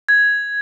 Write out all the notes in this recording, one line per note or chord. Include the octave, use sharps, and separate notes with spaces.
G#6